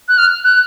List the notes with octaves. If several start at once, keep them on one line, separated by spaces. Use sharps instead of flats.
F#6
F6
F#6